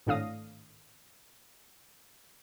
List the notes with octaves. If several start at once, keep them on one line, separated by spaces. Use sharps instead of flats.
G#1 A2 D4 F5 D#6 A#6